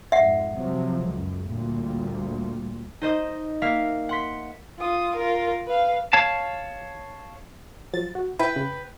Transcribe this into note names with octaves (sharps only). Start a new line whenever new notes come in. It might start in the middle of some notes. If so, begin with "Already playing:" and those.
F2 G#2 E5 F#5
C3 F3 F#3
C#2 F#2
D2 A#2 G3
D#4 C5 D#5 D#6
A#3 E5 F5
F#5 C6 B6
F4 D#6
F4 A#4
B4 F5
C#5 F5 A5
F3 F#3 A6
F#4
E4 B4 G5
C#3